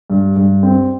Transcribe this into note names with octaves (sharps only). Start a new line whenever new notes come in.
G2
G2
C4